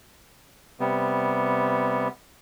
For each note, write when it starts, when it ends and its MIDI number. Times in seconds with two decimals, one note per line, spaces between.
0.80 2.08 48
0.80 2.08 55
0.80 2.08 59